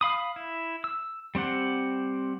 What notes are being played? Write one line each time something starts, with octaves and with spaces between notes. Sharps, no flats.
F5 B5 D#6
E4
E6
G3 C4 G4 F#5